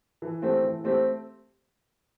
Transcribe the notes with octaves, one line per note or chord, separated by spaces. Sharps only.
E3
A3 C4 G4
E3
A3 C4 G4